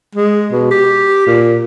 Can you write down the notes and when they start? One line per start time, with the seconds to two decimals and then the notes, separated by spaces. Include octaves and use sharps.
0.15 G#3
0.52 B2
0.71 G4
1.27 A#2